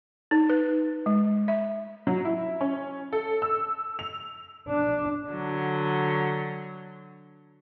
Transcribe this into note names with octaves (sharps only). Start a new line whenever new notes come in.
D#4
B4
G#3
E5
F#3
E4
C#4
A4
E6
F7
D4
D3 F#3